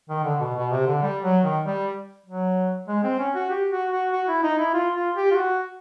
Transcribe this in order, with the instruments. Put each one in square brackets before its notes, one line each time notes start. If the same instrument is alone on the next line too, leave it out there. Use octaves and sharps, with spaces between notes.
[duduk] D#3
D3
B2
B2
C3
D3
G3
F#3
D#3
G3
F#3
G#3
C4
C#4
F#4
G4
F#4
F#4
F#4
E4
D#4
E4
F4
F4
G4
F4
F#4